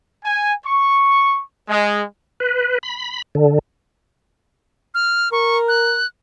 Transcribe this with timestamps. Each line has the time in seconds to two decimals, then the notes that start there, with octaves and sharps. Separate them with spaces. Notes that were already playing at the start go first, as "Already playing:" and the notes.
0.24 G#5
0.64 C#6
1.69 G#3
2.40 B4
2.83 B5
3.35 D3
4.94 F6
5.32 A#4 C#6
5.68 F#6